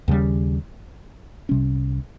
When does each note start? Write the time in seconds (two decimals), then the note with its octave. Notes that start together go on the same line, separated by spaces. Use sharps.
0.08 D#2 C#3 G3
1.49 C2 C3 G3 C#4